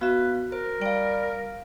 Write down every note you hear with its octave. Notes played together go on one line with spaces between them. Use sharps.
B3 F#4 B4 E5 F5
A#4 C5
G3 F5 G5 D7